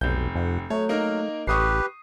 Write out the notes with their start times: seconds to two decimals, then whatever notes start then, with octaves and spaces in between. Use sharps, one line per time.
0.01 F1 B1 G6
0.35 F2 F#5
0.70 F#3 A3 C#5
0.89 A#3 D#4 A#4
1.47 A1 G4 B4 C#6 D#6 C7